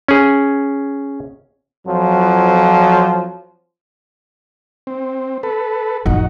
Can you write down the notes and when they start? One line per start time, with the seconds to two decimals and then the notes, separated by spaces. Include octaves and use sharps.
0.08 C#4 G#4
1.85 F2 F3 F#3
4.87 C4
5.43 A4 B4
6.06 A1 F2 D#4 F#4